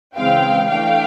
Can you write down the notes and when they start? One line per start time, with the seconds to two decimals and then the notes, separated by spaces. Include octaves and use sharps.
0.16 C#3 E3 G#3 C4 F5 G5
0.68 E3 A3 D4 F5 G5